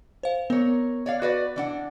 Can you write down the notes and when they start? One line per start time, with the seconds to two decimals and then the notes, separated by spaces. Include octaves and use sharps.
0.23 C5 F5
0.50 B3 A#4 C#5
1.06 C#5 D5 F5
1.22 F#4 B4 D5
1.56 E3 D4 F#5